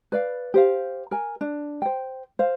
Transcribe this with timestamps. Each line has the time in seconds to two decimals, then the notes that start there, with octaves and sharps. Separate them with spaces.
0.12 B4 D5 F5
0.54 G4 C5 F5
1.11 A#4 G#5
1.41 D4
1.82 C5 G5
2.39 C5 F5